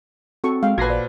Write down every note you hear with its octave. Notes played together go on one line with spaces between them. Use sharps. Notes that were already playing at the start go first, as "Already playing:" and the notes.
C4 F#4 A4 C#6
G#3 F5 G5
A1 A#2 F#4 B4 A5 G#6 A#6 C7
C5 D5